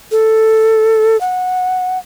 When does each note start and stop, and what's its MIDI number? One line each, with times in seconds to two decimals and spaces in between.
0.11 1.19 69
1.21 1.98 78